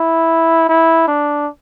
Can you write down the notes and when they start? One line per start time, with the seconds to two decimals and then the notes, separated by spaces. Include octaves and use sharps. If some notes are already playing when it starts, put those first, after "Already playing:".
Already playing: E4
0.69 E4
1.07 D4